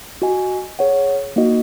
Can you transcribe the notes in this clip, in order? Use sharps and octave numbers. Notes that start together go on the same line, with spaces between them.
F#4 D#5 G#5
G#4 C#5 F#5
A#3 D#4 F#4 D#5